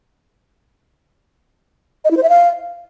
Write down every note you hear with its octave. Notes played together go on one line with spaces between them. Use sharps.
D#5
E4
C5
E5
F5